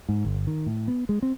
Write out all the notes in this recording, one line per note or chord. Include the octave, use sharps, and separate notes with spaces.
G#2
G1
D#3
A2
B3
G#3
C4